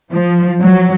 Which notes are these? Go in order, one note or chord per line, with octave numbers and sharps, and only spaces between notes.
F3
F#3